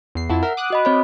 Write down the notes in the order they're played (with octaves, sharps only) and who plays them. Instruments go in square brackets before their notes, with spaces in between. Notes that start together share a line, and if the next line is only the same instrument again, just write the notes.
[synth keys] E2 C7
[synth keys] F2 E4 A5 [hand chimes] F#5
[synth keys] A#4 E5 [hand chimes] F#5
[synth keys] D6 D#6 F#6
[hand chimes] F#4 D#5 B5
C4 C#5 B5